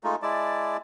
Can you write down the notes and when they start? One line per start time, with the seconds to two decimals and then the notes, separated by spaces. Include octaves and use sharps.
0.04 G#3 A3 D#4 F4
0.22 G#3 E4 D5 A5